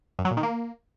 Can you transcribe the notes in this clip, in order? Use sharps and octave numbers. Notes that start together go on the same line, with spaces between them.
F#2
F#3
A#2
D#3
A#3